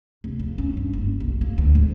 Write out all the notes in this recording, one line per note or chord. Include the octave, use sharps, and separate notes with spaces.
F1
F2
C#4
G2
F#1
B1
A#3
D2
G#2